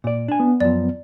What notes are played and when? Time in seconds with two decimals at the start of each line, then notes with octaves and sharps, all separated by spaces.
0.04 A#2 D5
0.28 D4 G#5
0.40 B3
0.60 F#2 F3 D5